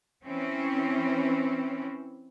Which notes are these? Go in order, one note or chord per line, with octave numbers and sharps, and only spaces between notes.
E3 C4 C#4